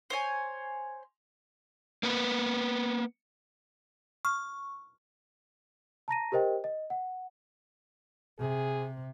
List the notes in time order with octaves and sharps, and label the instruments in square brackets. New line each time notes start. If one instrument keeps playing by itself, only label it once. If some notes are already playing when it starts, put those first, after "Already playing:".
[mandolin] C5 C#5 G#5
[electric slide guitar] A#3 B3 B4
[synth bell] C#6 [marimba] F6
[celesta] A5 A#5 A#6 D#7
G4 A#4 C5 D#5 G5
D#5
F#5
[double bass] C3 [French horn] G#4